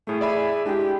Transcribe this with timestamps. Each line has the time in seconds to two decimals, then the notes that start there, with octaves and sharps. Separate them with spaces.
0.07 A2 A3 G#4
0.21 G#4 D5 E5 B5
0.65 G#3 D4 E4 G4